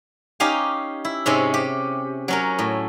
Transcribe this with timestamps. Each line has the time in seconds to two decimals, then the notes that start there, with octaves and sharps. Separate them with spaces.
0.40 C#4 D#4 G4 F5 G#5
1.05 E4
1.26 G#2 C3 G#3 C#4 C#5
1.54 G4
2.28 F#3 C#4 A#4
2.59 A2